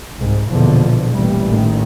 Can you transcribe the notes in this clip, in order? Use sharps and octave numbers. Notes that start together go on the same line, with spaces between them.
C2 G#2
A#1 E2 B2 D3 F3
A1 A#2 E3 G3
A1 D#3